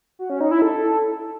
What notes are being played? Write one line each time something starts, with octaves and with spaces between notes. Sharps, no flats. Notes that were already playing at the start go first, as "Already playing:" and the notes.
F#4
C#4
D#4
E4
A4